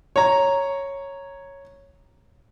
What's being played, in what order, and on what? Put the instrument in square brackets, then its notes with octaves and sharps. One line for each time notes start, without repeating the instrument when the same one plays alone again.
[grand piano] C#5 A#5